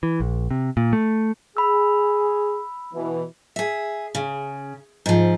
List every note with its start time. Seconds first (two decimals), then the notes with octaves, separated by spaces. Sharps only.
0.03 E3
0.20 A#1
0.51 C3
0.77 A#2
0.93 A3
1.57 G#4 B5 E6
2.94 B2 E3
3.56 G#4 E5
4.15 C#3
5.06 G#2 F3